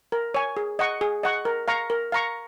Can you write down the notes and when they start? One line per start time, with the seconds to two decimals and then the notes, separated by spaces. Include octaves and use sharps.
0.12 A#4
0.35 C#5 G#5
0.57 G#4
0.79 D#5 F#5 C#6
1.01 G#4
1.23 D#5 F#5 C#6
1.45 A#4
1.68 F5 A#5 C#6
1.90 A#4
2.12 F5 A#5 C#6